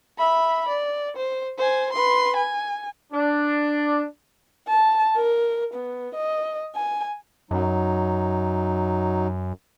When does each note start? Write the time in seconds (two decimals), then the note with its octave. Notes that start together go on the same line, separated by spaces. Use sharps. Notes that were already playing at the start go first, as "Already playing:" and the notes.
0.18 E5 B5
0.68 D5
1.16 C5
1.58 C5 G#5
1.93 B4 C6
2.36 G#5
3.13 D4
4.68 A5
5.16 A#4
5.74 B3
6.15 D#5
6.75 G#5
7.51 F#2 F#3 D#4